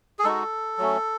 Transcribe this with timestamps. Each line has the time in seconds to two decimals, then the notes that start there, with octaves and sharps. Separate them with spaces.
0.19 G#4
0.24 G#3 D#4 F#4 A4
0.78 F#3 A3 C#4